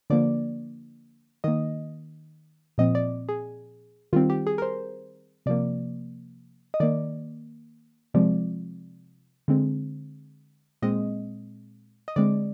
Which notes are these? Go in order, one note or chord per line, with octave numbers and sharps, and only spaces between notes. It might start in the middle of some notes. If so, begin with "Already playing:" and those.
D3 F3 A#3 D5
D#3 A#3 D#5
A#2 F3 C4 D#5
D5
G#4
D#3 G3 C4 F4
G4
G#4
A#4
C5
C3 F3 A#3 D5
D#5
D#3 A#3 D5
C3 F3 G#3 C4 D5
D3 G#3 C4
A#2 G#3 C4 D#5
D#5
D3 G#3 C4 D5